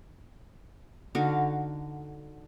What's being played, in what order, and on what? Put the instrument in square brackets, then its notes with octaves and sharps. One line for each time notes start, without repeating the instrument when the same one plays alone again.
[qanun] D3 D#4 F#4 F5